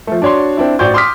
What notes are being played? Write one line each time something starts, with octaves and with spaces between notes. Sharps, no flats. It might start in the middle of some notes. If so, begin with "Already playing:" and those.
F3 A3
D4 F#4 C#5 D5 C6
C4 D4 E4
A1 F#4 C5 D5 C#6 G6
C6 D6 D#6 F6 B6